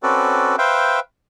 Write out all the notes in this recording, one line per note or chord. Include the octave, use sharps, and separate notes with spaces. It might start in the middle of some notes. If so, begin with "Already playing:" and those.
C4 C#4 F#4 A4 B4 D5
B4 C5 E5 F5 G5